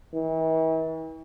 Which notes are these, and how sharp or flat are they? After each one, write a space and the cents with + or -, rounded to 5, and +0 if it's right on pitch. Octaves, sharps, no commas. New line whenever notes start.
E3 -40